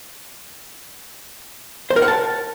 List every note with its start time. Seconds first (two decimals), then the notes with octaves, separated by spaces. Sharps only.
1.90 C5
1.96 A#4
2.02 F#5
2.08 A5